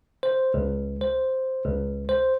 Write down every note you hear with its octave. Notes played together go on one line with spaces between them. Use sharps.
C5
C#2
C5
C#2
C5